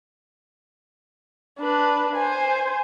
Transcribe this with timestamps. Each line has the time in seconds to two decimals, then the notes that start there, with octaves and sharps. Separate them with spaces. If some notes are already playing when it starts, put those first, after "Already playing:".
1.59 D4 B4
2.16 C5 G#5